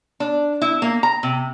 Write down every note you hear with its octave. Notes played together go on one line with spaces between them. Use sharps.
D4
E4
A#3
A#5
C3